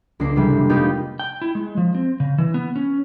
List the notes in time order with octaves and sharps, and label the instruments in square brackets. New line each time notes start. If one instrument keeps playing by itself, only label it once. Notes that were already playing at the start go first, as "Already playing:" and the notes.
[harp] C#2 A#3 D4 C7
C3 E3 G3 G#3
F1
A#3 B3 D#4 F4 G4
[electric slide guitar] G5
E4
G#3
F3
C4
C#3
E3
B3
C#4